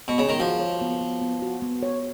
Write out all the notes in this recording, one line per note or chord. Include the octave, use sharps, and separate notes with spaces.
B2
C#3
D#3
F3 F#4
C#5
B3
B3
B3
F#4
B3
C#5